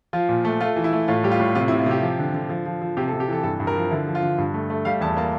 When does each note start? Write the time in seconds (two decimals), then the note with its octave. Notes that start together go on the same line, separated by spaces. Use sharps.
0.13 F3 F4
0.29 A#2
0.45 A3
0.60 A3 F4
0.76 E3
0.84 E4
0.93 A3
1.08 A2 F4
1.24 G3 G4
1.32 F4
1.40 A2
1.55 C3 F4
1.68 C3 E4
1.79 F4
1.86 C3 G4
2.02 F3
2.19 D3
2.34 D3
2.49 F3
2.66 F3
2.82 F3
2.97 C3 G4
3.08 A4
3.13 C3
3.20 G4
3.28 E3 A4
3.44 G2 A4
3.60 G2
3.67 A#4
3.75 F3
3.91 D3 E4
4.07 F3
4.15 F4
4.23 D3
4.38 G2
4.54 A3
4.70 A3
4.85 G3 F5
5.01 E2 A5
5.17 A#3 A5